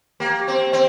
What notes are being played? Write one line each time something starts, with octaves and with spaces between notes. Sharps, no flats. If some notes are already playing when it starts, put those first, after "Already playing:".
A#3 G4 G5
G4 G5
C4
G4 G5
C4 D#5